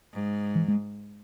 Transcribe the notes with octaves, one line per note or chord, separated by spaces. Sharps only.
G#2
E3
G#3